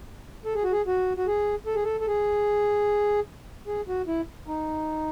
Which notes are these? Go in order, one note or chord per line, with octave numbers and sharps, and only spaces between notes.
A4
G#4
F#4
G#4
F#4
F#4
G#4
A4
G#4
A4
A4
G#4
G#4
F#4
E4
D#4